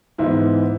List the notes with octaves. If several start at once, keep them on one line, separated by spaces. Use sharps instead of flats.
G#2 E3 G#3 B3 E4